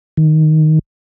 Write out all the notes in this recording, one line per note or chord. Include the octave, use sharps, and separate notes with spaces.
D#3